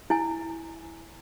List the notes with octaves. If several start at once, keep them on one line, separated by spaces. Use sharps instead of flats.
E4 G#5